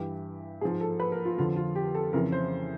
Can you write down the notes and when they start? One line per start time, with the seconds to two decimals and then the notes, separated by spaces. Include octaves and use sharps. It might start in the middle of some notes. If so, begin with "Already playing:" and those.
Already playing: G2 E3 G4
0.61 G#2 F3 G#4
0.81 A4
1.00 B4
1.12 A#4
1.25 F4
1.37 F2 D3 F3 F4
1.56 F4
1.75 G4
1.95 A4
2.13 F2 C#3 E3 A#4
2.32 C5